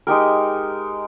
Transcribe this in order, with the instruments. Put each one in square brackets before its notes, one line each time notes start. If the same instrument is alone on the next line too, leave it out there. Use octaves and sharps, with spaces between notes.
[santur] G#3 D#4 G4 A#4